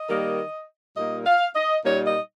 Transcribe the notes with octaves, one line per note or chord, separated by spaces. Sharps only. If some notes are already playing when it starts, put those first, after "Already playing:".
Already playing: D#5
D#3 G3 A#3
A#2 G3 A#3 D#4 D#5
F5
D#5
A#2 G3 A#3 D#4 C#5
D#5